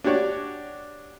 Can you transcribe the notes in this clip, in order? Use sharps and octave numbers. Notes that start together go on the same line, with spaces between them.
D4 F#4 G4 C#5 D5